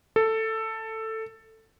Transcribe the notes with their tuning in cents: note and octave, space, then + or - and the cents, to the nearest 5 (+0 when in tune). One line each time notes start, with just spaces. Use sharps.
A4 +10